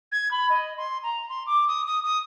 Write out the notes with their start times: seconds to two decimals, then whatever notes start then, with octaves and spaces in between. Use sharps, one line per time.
0.12 G#6
0.31 B5
0.50 D#5
0.77 C6
1.03 A#5
1.29 C6
1.46 D6
1.68 D#6
1.86 D#6
2.04 D#6